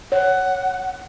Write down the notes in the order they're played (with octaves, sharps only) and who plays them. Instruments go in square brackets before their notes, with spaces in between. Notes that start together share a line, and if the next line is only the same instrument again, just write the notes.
[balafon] C#5 [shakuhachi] F#5